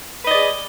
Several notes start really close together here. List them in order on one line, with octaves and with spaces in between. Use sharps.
B4 D#5 D5 G#4